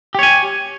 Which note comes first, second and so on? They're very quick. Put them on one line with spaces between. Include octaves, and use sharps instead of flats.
G4 C#5 G#5